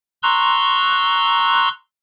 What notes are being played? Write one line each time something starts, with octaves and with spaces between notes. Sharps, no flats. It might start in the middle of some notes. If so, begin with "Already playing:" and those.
A#5 C6 C#6 E6 F#6